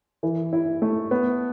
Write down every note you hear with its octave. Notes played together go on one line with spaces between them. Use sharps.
E3
E4
A3
B3